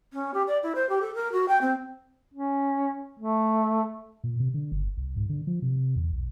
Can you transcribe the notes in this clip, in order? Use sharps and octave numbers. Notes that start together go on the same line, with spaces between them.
C#4
G4
D5
E4
C5
G4
A4
A#4
F#4
G5
C4
C#4
A3
A#2
C3
D3
G1
C2
G#2
D3
F3
C3
C3
E2
B1